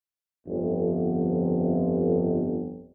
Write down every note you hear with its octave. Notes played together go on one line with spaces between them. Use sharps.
G1 F2